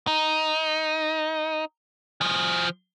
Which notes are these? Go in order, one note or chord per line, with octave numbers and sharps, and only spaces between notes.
D#4
F3 G#4